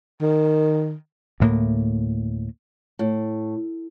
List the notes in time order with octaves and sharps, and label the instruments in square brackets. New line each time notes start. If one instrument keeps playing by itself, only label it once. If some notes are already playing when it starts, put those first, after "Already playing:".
[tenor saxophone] D#3
[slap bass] D2 A2 A#3
[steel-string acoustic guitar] A2